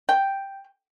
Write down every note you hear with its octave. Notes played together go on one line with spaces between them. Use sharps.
G5